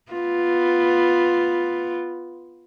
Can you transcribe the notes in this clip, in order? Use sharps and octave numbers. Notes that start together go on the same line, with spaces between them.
B3 F4